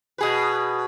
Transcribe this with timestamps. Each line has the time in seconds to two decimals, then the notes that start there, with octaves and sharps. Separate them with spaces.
0.18 B2 G#4 B4